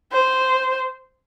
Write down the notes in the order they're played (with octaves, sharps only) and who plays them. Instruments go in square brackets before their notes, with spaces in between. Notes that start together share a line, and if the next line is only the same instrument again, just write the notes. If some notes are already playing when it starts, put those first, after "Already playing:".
[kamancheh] C5